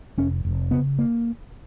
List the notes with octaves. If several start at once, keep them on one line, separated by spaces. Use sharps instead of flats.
F1 C#4
F1
C#3 B3
A#3